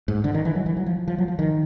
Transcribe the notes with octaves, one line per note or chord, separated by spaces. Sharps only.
G#2
D3
D#3
E3
F#3
E3
F#3
F3
F3
F#3
F3
D#3